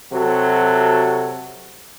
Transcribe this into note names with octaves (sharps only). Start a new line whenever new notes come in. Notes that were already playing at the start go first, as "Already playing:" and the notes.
C3 F#3 F#4 A4